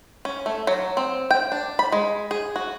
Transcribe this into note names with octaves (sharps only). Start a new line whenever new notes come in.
C#4
A3
F#3
C4
G5
D4
B5
G#3
G#4
F#4